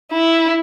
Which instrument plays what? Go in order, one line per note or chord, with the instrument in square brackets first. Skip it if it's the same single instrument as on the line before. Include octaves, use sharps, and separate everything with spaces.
[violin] E4